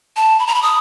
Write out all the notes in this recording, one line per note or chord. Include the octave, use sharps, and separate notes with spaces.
A5
B5
A#5
B5
D#6